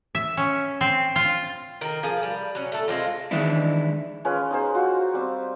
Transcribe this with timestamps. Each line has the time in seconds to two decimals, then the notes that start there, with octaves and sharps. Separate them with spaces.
0.15 E5
0.37 C#4
0.81 C4
1.16 F4
1.81 D#3 A#4
2.03 F3 G#4 A5
2.23 G3
2.55 F#3 C#4
2.72 A3 A4
2.88 G#3 C4 F4
3.31 D#3 E3 G#3 D4 E4
4.25 G#3 C#4 F4 B4
4.51 D#4 G#4 C5
4.75 F4 F#4
5.14 G3 C4